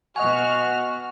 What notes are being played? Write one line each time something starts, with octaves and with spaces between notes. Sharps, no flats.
B2 F#4 D#5 F#5 G#5 C#6 F6